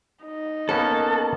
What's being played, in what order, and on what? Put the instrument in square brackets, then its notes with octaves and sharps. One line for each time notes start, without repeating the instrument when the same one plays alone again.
[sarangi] D#4
[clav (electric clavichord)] A#3 B3 C#4 [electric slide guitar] A4